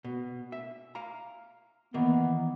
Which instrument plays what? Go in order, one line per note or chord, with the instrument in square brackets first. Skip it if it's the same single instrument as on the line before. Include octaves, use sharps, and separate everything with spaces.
[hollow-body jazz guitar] B2
E5
F5 A#5
[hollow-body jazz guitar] D#3 E3 A#3 [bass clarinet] B3